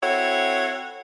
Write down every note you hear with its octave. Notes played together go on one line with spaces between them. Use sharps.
C4 E4 F#4 A4 C#5